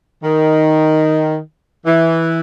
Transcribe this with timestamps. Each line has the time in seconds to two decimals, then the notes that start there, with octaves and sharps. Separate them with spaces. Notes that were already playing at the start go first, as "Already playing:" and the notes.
0.23 D#3
1.86 E3